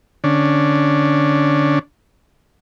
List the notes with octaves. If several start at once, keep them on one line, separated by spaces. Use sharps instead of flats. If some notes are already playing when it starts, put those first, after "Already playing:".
D3 C#4 D4